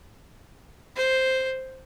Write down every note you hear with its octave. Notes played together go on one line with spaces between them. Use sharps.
C5